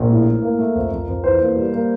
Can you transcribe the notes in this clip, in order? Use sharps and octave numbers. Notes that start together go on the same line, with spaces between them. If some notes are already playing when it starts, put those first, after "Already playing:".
Already playing: A#1 A#4
A2
A2
A#3
A3
F2
F2
F2
E2 C5
A#3
G3
A#3